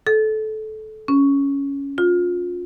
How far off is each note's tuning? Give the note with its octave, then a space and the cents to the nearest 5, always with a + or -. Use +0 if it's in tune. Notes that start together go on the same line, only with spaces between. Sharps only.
A4 -20
C#4 +5
F4 +25